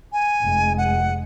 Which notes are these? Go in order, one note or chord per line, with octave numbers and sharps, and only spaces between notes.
G#5
F1 G#3
F#5